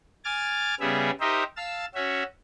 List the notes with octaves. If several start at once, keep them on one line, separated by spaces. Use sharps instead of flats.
G#5 D6 F6 A6
C#3 G3 B3 G#4 E5
D#4 G4 A#4 C5 D#5 E5
F5 A5 E6
C#4 F#4 E5